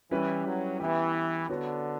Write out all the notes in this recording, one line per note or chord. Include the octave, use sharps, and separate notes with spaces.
E3 G3 C#4 E4 G4 B4
F#3
E3 B3 E4 G4
D3 B3 F#4 C#5